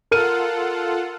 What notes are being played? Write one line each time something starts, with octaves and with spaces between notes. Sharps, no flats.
F4 A4 A#4 F#5 F6 D#7